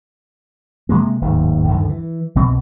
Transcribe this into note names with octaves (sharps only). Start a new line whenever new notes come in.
C3 F3 G#3 A#3
D1 D#2 G#2
D2 G2 D3 D#3
E3
C2 B2 C4